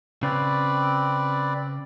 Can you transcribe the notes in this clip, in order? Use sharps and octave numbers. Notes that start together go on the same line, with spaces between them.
C#3 C4 B4 D5